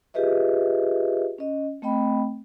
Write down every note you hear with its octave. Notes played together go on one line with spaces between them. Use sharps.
F4 G4 G#4 B4 D#5 E5
C#4 D#5
A3 C4 D#5 G5 B5